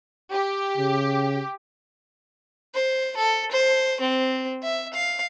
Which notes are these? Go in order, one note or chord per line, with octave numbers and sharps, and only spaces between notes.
G4
C#3
C5
A4
C5
C4
E5
F5